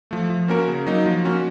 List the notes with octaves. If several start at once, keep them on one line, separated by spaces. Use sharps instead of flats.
F3 A3
F3
A#3 C#4 F#4 A#4
C#3
F#3 A#3 D#4
F3
A#3 C#4 F#4